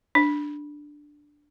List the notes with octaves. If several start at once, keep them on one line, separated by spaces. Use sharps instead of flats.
D4